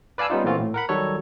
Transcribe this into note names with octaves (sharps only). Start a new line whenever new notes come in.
B4 D5 F5 G#5 A5 E6
G3 B3 C#4 D#4 F4
A#2 E3 A3 C4 F4 F#4
A2
A#4 F#5 B5
D#3 F#3 G3 A4 C#5